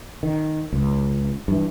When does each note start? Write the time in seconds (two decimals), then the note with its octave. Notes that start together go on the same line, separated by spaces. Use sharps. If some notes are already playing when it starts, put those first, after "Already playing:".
0.23 D#3
0.73 C#2
1.48 G2 E3